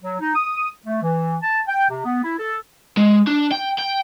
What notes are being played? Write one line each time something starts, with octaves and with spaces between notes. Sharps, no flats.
F#3
D#4
D#6
A3
E3
A5
G5
C3
B3
E4
A4
G#3
D4
G5
G5